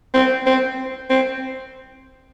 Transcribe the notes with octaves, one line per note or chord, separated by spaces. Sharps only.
C4
C4
C4